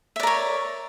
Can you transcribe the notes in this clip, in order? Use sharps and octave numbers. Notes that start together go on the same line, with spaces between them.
A#4 C#5 D5 E5